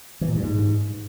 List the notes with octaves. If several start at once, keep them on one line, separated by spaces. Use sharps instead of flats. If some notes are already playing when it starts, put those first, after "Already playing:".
E3
A#2
G2
G#2